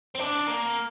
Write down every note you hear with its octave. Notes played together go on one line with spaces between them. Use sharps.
C4
D4
A#3